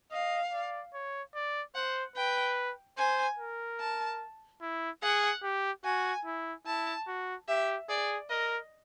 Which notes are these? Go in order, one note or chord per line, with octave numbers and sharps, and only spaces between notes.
D#5 F5
D5
C#5
D5
C5 F#5
B4 G5
C5 G#5
A#4
A5
E4
G#4 F#5
G4
F#4 G#5
E4
E4 A5
F#4
G4 E5
G#4 D5
A#4 D#5